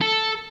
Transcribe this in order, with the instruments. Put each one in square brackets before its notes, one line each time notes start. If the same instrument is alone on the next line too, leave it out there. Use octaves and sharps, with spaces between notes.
[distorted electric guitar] A4